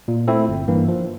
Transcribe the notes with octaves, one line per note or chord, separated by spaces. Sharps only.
A#2
A3 C4 E4 A4
G1
G2 E3 A#3
F3